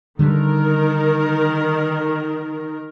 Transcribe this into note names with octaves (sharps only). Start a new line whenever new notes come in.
D3 D#3 G3 A#4